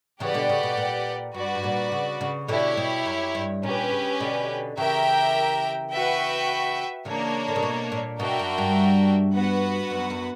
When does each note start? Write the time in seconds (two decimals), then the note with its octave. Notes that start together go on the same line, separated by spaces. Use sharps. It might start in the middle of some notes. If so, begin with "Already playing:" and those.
0.20 C#3 E3 G4 B4 D5 F#5
0.34 B2 D3
0.49 C#3
0.63 B2
0.77 A#2
1.34 G2 F#4 B4 D5
1.55 G2
1.64 A#2
1.92 C#3
2.21 C#3
2.48 B2 D3 E4 G4 C#5
2.77 B2
3.05 F#2
3.35 G2
3.63 A#2 C#4 G4 B4
3.92 C#3
4.20 B2 D3
4.77 C#3 E3 G4 A#4 E5 G5
5.91 F#4 B4 E5 G5
7.05 C#3 E3 A#3 D4 A#4 C#5
7.48 D3
7.56 C#3
7.63 B2
7.92 A#2
8.19 B2 D4 F#4 A#4 E5 G5
8.39 F#2
8.58 G2
9.34 B3 F#4 B4 F#5
9.91 F#2
10.10 F#2